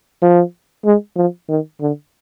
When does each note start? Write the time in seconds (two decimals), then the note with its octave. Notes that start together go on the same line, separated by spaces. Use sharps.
0.22 F3
0.85 G#3
1.16 F3
1.49 D#3
1.81 D3